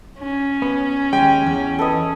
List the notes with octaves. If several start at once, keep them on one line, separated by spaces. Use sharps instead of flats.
C#4
B3
D#2 G#3 G5
E2
A4 B4 D#5